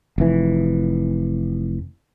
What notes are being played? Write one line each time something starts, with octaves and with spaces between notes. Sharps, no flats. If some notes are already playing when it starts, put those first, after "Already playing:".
F1 E3